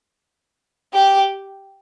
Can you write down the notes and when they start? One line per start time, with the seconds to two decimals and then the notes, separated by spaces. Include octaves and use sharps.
0.93 G4